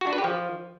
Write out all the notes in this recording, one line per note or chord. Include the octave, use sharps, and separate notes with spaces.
F#4
D4
B4
G4
F3